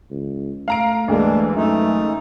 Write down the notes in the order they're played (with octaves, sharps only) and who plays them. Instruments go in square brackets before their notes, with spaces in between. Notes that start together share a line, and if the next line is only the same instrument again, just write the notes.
[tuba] C#2
[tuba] A3 [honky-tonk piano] F5 A#5 D7
[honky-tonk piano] D2 G#3 A#3 [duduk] E3 [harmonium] D4
[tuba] F#2 [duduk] A3 [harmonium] D#4